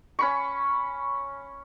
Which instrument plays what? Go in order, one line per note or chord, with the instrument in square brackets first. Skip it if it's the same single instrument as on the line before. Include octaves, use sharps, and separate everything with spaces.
[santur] C#4 B5 C#6